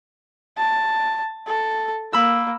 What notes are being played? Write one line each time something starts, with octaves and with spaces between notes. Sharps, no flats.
A5
A4
A#3 B5 E6